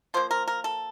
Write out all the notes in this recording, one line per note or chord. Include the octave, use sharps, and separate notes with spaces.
F3 A#3 C5
A#4
A#4
A4